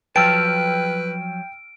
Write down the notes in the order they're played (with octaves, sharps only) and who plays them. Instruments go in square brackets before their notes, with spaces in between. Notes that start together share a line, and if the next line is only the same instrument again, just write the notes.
[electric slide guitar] F3 F#3 A5 [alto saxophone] B4 [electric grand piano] G5 E6 F6 [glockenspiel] D7